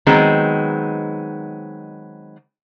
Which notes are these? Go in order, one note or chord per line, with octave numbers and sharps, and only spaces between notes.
D#3 F#3 G#3 B3 C4